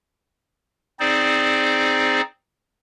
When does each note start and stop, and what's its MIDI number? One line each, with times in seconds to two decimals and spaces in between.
1.00 2.21 60
1.00 2.21 63
1.00 2.21 68
1.00 2.21 72
1.00 2.21 74